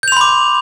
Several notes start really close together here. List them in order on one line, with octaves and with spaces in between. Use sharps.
G6 F7 C6 B5 D6